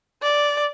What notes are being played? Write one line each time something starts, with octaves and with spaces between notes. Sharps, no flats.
D5